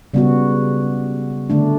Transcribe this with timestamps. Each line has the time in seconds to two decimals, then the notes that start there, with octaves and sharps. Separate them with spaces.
0.14 C#3 G3 B3 F#4
1.50 D3 A3 D4